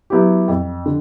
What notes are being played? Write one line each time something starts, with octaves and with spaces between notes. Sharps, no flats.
F#3 B3 E4 G4
F2
D3